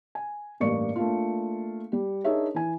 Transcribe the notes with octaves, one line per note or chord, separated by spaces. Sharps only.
G#5
A1 G2 A#3 D5 C#6 C#7
A3 A#3 D4 F4
G3 G4
D4 D#4 G#4 A#4 C#5 E5
E3 G#5